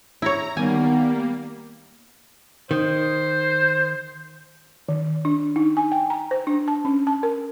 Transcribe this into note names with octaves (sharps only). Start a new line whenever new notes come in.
E4 C#5 A#5
D#3 G3 A#3 B3 G#5
D#3 C5
D#3
D4
D#4
G#5
G5
A#5
C5
D4
A5
C#4
A5
A#4